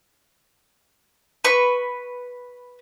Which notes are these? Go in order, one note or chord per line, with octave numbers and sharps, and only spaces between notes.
B4 C#6